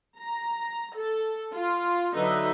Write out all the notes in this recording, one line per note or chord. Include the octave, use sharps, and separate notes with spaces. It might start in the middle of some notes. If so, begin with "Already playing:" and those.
A#5
A4
F4
D3 F#3 D#4 B4 D#5 E5